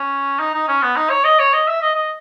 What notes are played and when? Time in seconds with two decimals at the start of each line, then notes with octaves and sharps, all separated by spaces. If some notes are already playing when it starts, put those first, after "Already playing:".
Already playing: C#4
0.39 D#4
0.54 D#4
0.68 C#4
0.82 B3
0.97 D#4
1.10 C#5
1.25 D#5
1.39 C#5
1.53 D#5
1.68 E5
1.82 D#5
1.95 D#5